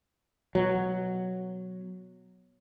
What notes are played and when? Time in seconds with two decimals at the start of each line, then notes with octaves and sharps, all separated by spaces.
0.55 B2 F#3